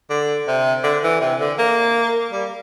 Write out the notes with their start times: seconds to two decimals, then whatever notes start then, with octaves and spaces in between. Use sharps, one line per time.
0.10 D3
0.47 C3
0.83 D3
1.03 E3
1.21 C3
1.40 D3
1.58 A#3
2.32 G3